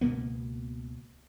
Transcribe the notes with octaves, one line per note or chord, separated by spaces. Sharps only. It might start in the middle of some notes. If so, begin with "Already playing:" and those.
C#2 B2 A#3 B3